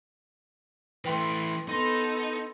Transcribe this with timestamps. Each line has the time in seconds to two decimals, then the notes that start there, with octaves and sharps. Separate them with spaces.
1.05 E3 A3 B4 G5 C6
1.68 B3 D#4 A4 C6 A#6